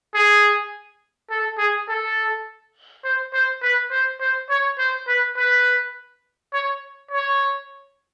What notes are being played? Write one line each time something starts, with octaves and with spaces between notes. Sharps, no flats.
G#4
A4
G#4
A4
C5
C5
B4
C5
C5
C#5
C5
B4
B4
C#5
C#5